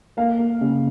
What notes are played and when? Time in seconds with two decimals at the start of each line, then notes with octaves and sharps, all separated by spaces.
0.17 A#3 F5
0.39 A#3
0.61 C#3